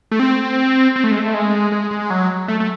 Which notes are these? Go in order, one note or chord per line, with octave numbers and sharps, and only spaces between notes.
A3
C4
C4
A3
G#3
A3
G#3
G#3
G#3
F#3
A3
A3